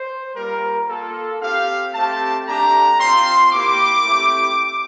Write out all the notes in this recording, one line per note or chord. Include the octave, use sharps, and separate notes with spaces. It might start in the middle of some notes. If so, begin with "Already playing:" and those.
Already playing: C5
G3 A#3 F4 A#4
A#3 F4 A4
C4 G4 F5
A3 C4 G4 A5
A3 D4 G4 A#5
C4 F4 C6
A#3 E4 G4 D6
A3 C4 E4 G4